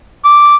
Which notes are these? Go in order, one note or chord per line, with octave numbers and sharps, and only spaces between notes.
D6